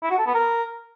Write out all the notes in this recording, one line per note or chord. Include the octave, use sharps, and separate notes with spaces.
E4
F#4
A4
B3
A#4